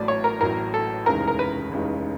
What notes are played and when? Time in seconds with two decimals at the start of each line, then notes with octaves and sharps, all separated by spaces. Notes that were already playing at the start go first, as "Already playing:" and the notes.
Already playing: A1 A2 F#3 D5
0.08 C#5
0.24 A#4
0.40 A1 A2 F#3 A#4
0.74 A4
1.06 F1 D#2 C#3 E3 G#3 A#4
1.28 A#4
1.39 B4
1.72 F1 D#2 C#3 E3 G#3